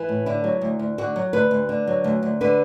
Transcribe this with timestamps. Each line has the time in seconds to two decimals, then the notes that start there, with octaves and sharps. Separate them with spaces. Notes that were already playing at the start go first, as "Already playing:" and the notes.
Already playing: E3
0.09 A2
0.26 D3 E4
0.44 F#3
0.61 D2
0.79 D2
0.98 D3 F#4
1.16 F#3
1.33 D2 B4
1.51 D2
1.69 D3
1.87 F#3
2.04 D2
2.23 D2
2.41 D3 B4